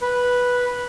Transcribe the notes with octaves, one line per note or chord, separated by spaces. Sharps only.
B4